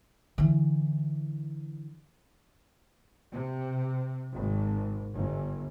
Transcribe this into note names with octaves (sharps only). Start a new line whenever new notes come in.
D3 E3
C3
G#1
G1